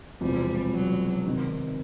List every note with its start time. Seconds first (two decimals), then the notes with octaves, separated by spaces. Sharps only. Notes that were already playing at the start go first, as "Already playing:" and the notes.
0.21 E1 E2 C3 F3 G3
0.73 F#3
1.26 C3 D#3